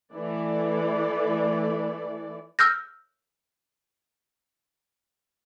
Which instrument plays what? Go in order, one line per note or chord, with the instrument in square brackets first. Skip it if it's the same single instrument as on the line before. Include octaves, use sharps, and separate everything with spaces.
[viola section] E3 A3 D5
[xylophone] E6 F6 G6 A#6